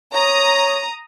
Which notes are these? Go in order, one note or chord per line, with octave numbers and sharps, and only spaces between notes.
C#5 A#5 D#6